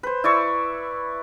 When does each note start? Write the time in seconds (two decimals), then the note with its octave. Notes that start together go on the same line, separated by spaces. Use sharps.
0.03 B4 C5
0.24 E4 D5 C#6 E6